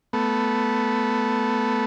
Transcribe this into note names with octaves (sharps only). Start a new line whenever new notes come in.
A3 B3